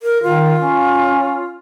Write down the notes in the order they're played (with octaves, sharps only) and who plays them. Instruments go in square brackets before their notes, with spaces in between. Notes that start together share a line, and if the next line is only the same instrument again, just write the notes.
[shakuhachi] A#4
[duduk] D#3 [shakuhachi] F4
[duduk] C#4